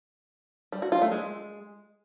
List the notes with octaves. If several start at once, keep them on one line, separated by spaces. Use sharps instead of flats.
G3
F#4
F4
A3
G#3